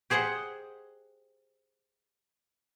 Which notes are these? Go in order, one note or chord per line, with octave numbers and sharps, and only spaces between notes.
G4 G#4 C5 D#5 F#5